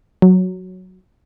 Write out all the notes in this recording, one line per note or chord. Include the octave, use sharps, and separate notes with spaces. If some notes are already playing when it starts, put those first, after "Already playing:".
F#3